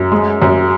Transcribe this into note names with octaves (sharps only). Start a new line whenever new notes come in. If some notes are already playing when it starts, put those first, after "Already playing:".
Already playing: F#2
G#3
F#2